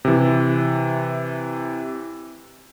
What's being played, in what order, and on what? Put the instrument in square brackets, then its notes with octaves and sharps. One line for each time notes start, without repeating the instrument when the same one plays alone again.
[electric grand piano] C3 E3